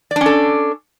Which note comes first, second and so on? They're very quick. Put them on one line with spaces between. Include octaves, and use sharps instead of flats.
D5 D4 C#4 A4